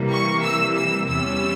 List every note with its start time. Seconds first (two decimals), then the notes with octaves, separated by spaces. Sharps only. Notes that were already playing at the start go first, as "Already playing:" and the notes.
Already playing: C3 E3 G3 A#3
0.10 C#6
0.43 E6
0.75 E6
1.08 E2 C3 E3 G3 C#4 E6